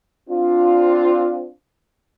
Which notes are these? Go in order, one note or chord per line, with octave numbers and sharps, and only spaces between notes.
C4 D4 F4